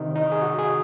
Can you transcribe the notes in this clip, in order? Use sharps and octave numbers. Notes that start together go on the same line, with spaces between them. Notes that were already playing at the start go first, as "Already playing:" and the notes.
Already playing: C3 D#3 D#4
D#4
G#4
F#4
G#4